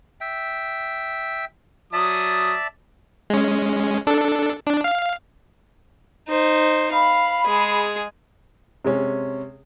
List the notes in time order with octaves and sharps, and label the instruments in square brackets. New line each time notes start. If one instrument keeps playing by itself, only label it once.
[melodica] E5 G5
[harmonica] F#3 D#6 [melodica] D5 E5 A5
[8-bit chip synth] G#3 C#4
D4 A4
D4
F5
[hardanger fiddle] D#4 C5
[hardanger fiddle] F5 [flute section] B5
[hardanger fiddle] G#3 G#4
[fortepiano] C3 G#3 C#4